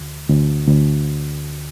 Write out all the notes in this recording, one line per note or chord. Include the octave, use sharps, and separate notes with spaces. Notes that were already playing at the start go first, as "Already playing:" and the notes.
Already playing: D2
D2
D2